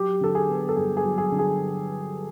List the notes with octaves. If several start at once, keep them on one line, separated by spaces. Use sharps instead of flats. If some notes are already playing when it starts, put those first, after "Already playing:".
Already playing: F#3 G4
D3 A4
G#4
B3
A4
G2 G#4
G#4
F#3
G#4
D3
G#4